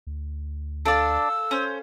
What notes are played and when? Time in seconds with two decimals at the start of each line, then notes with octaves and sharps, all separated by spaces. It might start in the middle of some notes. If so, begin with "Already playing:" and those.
0.07 D2
0.86 D4 A4 D5 F5 E6
1.51 C#4 C5